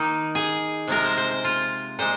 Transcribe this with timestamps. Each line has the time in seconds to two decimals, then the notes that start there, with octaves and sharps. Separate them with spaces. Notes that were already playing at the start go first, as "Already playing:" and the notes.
Already playing: D#3 A#3 D#4
0.35 G#4
0.88 C3 F3 G#3 A#4
1.04 C5
1.17 C5
1.31 C5
1.44 F4
1.99 A#2 G#3 C5